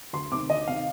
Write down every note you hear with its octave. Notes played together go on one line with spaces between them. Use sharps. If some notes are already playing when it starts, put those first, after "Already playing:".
D2 C6
C3 D#3 D6
D2 D#5
C3 D#3 F5